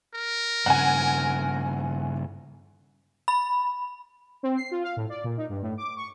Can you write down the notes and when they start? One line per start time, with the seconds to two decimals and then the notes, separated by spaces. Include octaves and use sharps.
0.14 A#4
0.66 G2 C#3 F#5 G#5
3.28 B5
4.43 C4
4.57 C7
4.71 F4
4.83 F5
4.97 A2
5.10 D5
5.24 A#2
5.38 D#4
5.49 G2
5.62 A2
5.78 D6
5.96 C#6